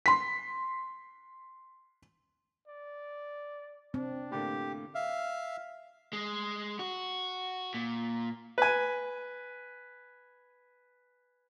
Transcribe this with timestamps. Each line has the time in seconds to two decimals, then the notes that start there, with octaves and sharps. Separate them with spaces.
0.06 C6 B6
2.67 D5
3.94 C4 D4
4.32 A2 D3 A#3 G4
4.95 E5 F5
6.13 G#3
6.79 F#4
7.74 A#2
8.58 B4 G#5